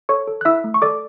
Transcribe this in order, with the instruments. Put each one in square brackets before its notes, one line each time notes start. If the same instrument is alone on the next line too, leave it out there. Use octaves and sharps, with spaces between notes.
[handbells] A4 C#5 C#6
A4
F#6
E4 E5 E6
A3
C#6
A4 D5 D6